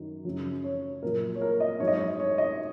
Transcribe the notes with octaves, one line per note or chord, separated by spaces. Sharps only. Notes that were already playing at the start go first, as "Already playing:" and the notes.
Already playing: F#2 D#3 F#3
F#2 C#3 F#3
C#5
A#2 F#3 A#4
C#5
A#4
D#5
G#2 F#3 C#5
D#5
C#5
C#5
D#5